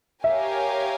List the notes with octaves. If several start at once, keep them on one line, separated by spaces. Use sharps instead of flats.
G4 A#4 C#5 E5 F5 G#5